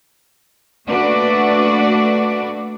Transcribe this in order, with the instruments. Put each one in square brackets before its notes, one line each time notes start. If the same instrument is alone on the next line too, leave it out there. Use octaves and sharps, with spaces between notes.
[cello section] A3 A#3 D4 F#4 B4 D5